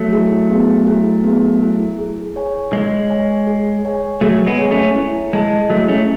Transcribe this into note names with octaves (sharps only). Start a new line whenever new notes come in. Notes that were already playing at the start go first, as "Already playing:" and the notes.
Already playing: F#3 A3
E4 G#4
B3
E4 G#4
B3
E4 G#4
G#4
C#5 G#5
G#3 G#4
C#5 G#5
G#4
C#5 G#5
F#3 A3 G#4
G#3 B3
C#5 G#5
A3 C#4
E4
G#3 G#4 D#5 A5
F#3 A3 E4
A3 C#4